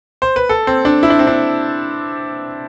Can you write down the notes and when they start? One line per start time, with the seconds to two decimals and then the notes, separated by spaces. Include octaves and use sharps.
0.22 C5
0.36 B4
0.49 A4
0.67 C4
0.85 D4
1.03 E4
1.10 D4
1.19 C4
1.27 D4